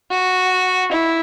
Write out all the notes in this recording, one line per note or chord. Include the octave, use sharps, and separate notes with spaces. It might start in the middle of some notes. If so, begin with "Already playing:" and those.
F#4
E4